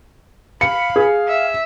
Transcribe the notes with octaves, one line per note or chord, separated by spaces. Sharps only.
F5 B5 C#7
G#4
E5